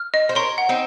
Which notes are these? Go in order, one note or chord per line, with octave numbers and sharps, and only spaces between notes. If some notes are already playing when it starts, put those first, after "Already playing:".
Already playing: F6
D#5
C5
A#4 C#5 C6
F#5
C4 D#4